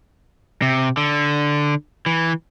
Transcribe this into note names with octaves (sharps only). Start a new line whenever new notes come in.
C3
D3
E3